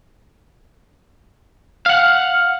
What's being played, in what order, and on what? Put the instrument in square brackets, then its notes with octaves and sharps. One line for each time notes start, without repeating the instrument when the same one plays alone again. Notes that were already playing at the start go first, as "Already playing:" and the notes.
[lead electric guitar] F5 F#5